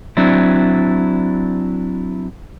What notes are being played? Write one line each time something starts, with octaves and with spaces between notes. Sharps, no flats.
F#3 C4 D4 E4